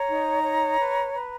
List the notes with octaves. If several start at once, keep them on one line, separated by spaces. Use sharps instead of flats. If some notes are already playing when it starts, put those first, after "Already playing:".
Already playing: C#5 A#5
D#4
C#5
B4
B4